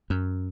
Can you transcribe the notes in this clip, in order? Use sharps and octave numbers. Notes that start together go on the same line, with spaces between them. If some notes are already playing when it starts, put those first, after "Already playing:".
F#2